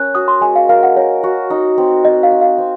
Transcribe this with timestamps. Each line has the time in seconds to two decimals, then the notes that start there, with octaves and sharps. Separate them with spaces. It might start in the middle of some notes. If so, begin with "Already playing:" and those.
Already playing: C#4 A#4 F#6
0.15 F#4 D#6
0.28 C6
0.41 G#3 G#5
0.55 F5
0.69 A#4 F5
0.83 F#5
0.96 A#4 C#5
1.24 F#4
1.50 D#4
1.78 C4
2.05 C4 D#5
2.23 F5
2.32 C4
2.41 F5
2.58 C4